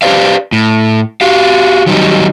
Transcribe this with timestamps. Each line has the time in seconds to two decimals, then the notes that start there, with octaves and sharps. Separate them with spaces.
0.02 G4 B4 C5 D5 F5
0.52 A2
1.21 F#4 G4 F5
1.86 D#3 F#3 G3 D#4